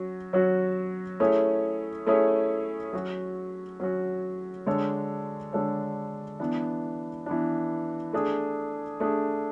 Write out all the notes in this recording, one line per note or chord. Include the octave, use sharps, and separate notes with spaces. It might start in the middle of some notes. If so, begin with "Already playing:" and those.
Already playing: F#3 C#4 F#4
F#3 C#4 F#4 C#5
A3 C#4 E4 G#4 C#5
A3 C#4 E4 G#4 C#5
F#3 C#4 F#4
F#3 C#4 F#4
D3 G#3 D4 A4 C#5
D3 G#3 D4 A4 C#5
E3 B3 D4
E3 B3 D4
A3 D4 G#4
A3 D4 G#4